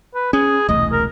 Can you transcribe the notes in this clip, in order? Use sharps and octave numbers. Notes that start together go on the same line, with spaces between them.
B4
C#4 G#4
E1 C2 A3 D#5
A#4